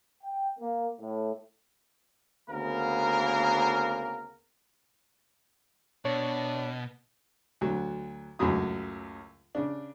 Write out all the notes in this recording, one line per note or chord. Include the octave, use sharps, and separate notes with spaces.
G5
A#3
A2
D2 C#3 A#3 B3 A#4
B2 D4 C#5
D2 F#3
C#2 F#2 A2 F#3 D#6
C#3 D4